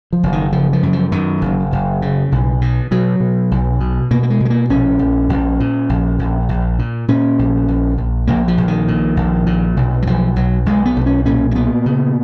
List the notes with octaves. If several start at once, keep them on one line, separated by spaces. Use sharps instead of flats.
F3
F#1
D#3
C#3 F3
F3
F#2
F3
F#2 D#3
F#1
F#1
C#3
B1
B2
B2 F#3
B2
B1
B2
B2 A#3
A#3
G#3
B2
G#3
A#3
A#1 C#4
A#1
A#1
A#2
A#1
A#1
A#1
A#2
A#2 C#4
A#1
A#1
A#1
A#1 A#3
F3
A#1
D#3
A#2
A#1
A#2
B1
F#3
B1 F3
B1 F#3
B1 G#3
B3
B1
C#4
A#2 C#4
A#3
A#2 B3
C#3